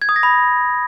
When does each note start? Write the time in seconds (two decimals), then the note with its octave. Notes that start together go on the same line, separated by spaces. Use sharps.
0.02 G#6
0.09 D#6
0.16 A#6
0.23 B5